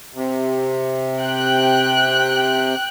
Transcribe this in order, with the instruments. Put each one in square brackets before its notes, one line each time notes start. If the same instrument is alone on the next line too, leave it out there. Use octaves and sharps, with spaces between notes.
[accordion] C3
[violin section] G5 F#6